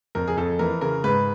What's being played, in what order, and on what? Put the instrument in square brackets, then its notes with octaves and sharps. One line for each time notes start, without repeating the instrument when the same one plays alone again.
[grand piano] F2 A#4
G#4
F2 A4
E3 A#4
C#3 A#4
G#2 B4